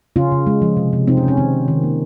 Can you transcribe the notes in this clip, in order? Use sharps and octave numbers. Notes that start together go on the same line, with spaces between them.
C#3 C#4 F4
C#3
G#3
F3
C3
C3
C3 C4 D#4
C#4
C3
C#4
D#3 C4
D#3
D#3
A#3